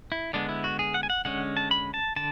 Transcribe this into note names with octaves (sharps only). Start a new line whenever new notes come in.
E4
D3 G#3 B3 D4
E4
F#4
G#4
F#5
G#5
F#5
D3 G#3 C#4 F#5
A5
B5
A5
D3 A5